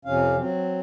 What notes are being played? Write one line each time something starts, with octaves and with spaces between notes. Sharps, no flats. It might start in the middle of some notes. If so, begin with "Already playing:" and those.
F2 C3 C#4 F5
F#3 C4